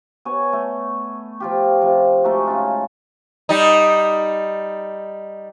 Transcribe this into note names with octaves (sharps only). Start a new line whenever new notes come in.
B3 C#5 G#5
A3
F3 F4 G4
C3 F3
G#3 A3 D#4 F#4
C#3 F4
G3 D#4